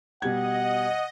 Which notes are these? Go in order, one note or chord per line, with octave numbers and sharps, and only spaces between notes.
B2 G3 D#5 F#5 G#6